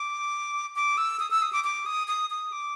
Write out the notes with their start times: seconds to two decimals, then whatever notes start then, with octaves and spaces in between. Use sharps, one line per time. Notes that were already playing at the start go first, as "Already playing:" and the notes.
Already playing: D6
0.76 D6
0.97 E6
1.20 D#6
1.31 E6
1.42 D#6
1.53 D6
1.64 D6
1.86 D#6
2.08 D#6
2.30 D#6
2.52 D6